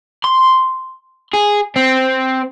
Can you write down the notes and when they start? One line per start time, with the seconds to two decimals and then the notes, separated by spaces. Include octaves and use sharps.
0.25 C6
1.34 G#4
1.76 C4